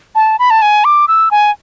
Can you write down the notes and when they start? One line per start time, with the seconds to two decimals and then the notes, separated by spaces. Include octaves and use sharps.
0.15 A5
0.39 B5
0.50 A5
0.62 G#5
0.84 D6
1.08 E6
1.31 G#5